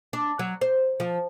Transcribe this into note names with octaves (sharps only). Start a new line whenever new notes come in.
D4
F#3
C5
F3